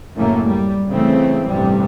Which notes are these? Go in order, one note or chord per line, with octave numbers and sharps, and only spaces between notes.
F#2 A2 C#3 A3 A#3
G3
C#3 E3 A3 C4
A1 G2 C3 G3